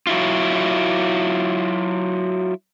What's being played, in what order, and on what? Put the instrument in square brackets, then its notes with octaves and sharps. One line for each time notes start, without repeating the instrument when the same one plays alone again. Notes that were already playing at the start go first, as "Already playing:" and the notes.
[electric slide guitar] F#3 E4 F4